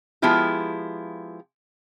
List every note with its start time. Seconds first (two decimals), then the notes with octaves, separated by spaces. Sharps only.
0.22 F3 G#3 B3 E4 F4 G4